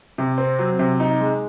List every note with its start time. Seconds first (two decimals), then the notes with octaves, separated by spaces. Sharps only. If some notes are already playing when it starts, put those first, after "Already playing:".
0.18 C3
0.38 C4
0.59 F#3
0.79 C3
1.00 D#4
1.20 G#3